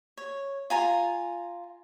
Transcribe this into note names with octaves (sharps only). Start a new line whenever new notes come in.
C#5
F4 G#5 A#5 C6